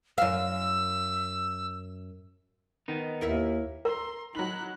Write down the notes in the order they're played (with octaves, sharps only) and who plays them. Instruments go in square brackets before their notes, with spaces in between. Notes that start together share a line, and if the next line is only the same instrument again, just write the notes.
[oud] F#2 F5 [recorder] E6
[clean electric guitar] D#3 B3 D#4
[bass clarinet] D#2 [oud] E4 A#4 E5
[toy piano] A#4 [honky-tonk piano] A#5 [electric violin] C6
[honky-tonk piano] F#3 F#7 [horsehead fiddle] D#4 [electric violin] B5 F#6